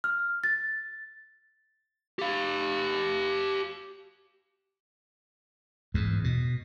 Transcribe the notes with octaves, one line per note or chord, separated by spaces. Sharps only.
F6
A6
G4 F5
E2 G#2
B2